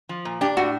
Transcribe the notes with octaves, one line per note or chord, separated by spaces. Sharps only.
F3
A#2
D4 G4
A2 F#4